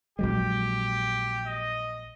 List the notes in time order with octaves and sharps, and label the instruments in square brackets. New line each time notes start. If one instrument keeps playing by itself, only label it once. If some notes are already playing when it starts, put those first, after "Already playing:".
[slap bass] A#1 F#3 G#3 [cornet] G4
[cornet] D#5